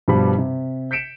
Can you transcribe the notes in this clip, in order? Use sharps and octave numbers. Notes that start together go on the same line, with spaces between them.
G2 B2 F3 G3 B5
C3
G6 B6 C#7 D7 E7